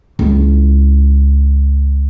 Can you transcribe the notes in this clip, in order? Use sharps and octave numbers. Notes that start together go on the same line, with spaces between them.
C#2 E4